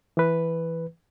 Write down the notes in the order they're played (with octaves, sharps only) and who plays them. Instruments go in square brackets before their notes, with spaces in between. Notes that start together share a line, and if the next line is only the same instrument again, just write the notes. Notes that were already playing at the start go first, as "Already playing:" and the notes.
[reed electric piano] E3 B4